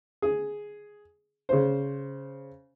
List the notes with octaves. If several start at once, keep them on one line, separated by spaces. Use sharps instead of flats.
G#4
C#3 C5